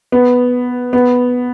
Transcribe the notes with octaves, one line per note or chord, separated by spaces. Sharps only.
B3
B3